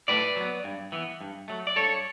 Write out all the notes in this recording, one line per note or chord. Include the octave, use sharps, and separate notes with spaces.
A2 B4 D5
F#3 B3
G2
E3 B3
G2
F#3 A3
D5
G2 A4 C#5